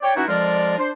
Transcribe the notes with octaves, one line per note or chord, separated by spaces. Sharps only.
C#5 D5 G5
E3 C#4 D#4 E4 F#4
F2 F3 G#3 F4 A#4 D5
D4 C5